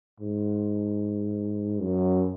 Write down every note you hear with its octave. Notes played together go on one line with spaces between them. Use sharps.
G#2
F#2